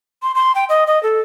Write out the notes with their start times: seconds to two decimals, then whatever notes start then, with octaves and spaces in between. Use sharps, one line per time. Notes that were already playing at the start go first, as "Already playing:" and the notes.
0.23 C6
0.35 C6
0.55 G5
0.69 D#5
0.87 D#5
1.03 A4